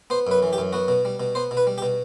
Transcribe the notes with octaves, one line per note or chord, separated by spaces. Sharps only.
B3 C5
F#2 B4
E3
G4
F#2
B3 F#4
B2
G3
B2
B3 C5
B2
B4
G3
G4
B2